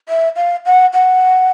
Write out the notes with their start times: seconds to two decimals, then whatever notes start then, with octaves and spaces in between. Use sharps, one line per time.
0.09 E5
0.36 F5
0.66 F#5
0.93 F#5